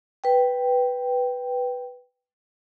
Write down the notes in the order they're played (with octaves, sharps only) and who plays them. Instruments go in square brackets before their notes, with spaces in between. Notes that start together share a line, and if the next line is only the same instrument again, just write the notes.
[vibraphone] B4 G5